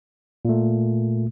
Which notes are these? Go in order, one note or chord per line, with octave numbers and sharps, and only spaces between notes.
A#2 A3